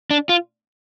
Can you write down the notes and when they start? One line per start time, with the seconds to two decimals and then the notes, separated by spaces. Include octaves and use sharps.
0.11 D4
0.29 F4